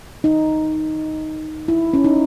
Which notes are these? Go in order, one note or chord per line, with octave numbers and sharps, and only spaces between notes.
D#4
E4
C#4
D#4